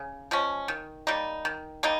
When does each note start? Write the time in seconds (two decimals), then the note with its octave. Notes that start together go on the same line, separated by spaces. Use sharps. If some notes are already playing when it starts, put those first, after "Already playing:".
Already playing: C#3
0.31 F3 G#3 C#4
0.68 D#3
1.07 G3 A#3 D#4
1.45 D#3
1.83 G3 A#3 D#4